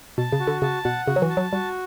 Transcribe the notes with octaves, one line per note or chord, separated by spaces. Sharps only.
B2 A5
C#3
F#4
D3
C#3 A5
B2 F#5
C#3 F#4
F#3
E3
A5
F#3
G3 F#4